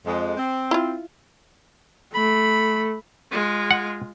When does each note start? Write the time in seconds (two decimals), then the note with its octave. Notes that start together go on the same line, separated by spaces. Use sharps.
0.05 F2 G#3
0.36 C4
0.71 E4 F4
2.14 A3 B5
3.31 G#3 F4
3.71 F#5